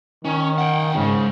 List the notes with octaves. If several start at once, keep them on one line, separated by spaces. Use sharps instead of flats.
D#3 C#4
F#5 G5
F2 G#2 C#3